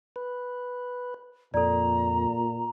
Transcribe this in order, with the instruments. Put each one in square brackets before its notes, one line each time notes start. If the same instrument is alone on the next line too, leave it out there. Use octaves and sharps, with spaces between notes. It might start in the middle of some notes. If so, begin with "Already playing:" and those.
[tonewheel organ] B4
[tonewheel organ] F2 [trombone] A#2 [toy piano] A4 D5 [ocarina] A#5